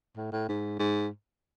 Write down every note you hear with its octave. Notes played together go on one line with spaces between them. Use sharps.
A2
A2
G#2
G#2